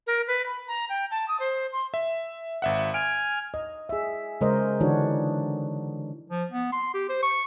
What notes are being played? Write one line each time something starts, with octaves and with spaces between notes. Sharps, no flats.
A#4
B4
B5
A#5
G5
A5
D#6
C5
C6
E5
G#1 E5 F#5
G#5 F6 D7
D#5
G#4 E5
C#3 G#3 A#4 C5 D#5
D3 E3 D4 D#4 F#4 C#5
F3
B3
C6
G4
C5
C#6